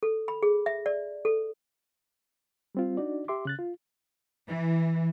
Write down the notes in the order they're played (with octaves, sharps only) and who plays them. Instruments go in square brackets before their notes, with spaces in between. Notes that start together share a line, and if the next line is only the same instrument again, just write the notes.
[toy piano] A4
B5
G#4
E5
D5
A4
[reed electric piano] G3 C4 F4
D4 D#4 F#4 D5
G4 E5 C6 D6
C#3 F#6 A6
F4
[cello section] E3